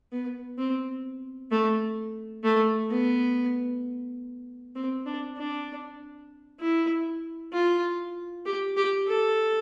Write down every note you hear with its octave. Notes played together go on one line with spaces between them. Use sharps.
B3
C4
A3
A3
B3
C4
D4
D4
E4
F4
G4
G4
A4